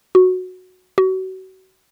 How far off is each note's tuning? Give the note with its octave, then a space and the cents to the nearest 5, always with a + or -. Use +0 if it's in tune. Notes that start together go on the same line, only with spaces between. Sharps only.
F#4 -10
F#4 +30